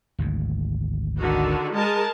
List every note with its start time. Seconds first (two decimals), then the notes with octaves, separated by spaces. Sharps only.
0.19 G#1 D2 G#2
1.18 D3 D#3 F#4
1.73 G#3 A#4 A5